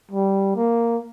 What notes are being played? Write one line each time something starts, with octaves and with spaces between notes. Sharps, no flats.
G3
A#3